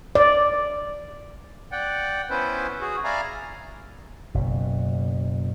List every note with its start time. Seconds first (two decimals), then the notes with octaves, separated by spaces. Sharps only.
0.15 D5
1.72 D5 F#5 G5
2.30 B3 C#4 E4 B4 C5
2.81 F#4 G#4
3.05 D5 E5 F5 G#5 A#5 B5
4.35 F#1 B2